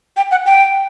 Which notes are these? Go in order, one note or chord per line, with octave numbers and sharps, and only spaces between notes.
G5
F#5
G5